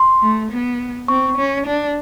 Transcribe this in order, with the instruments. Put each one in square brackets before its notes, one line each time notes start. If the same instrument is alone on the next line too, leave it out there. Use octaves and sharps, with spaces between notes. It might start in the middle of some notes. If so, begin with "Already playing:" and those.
Already playing: [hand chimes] C6
[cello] A3
B3
[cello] C4 [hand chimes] C#6
[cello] C#4
D4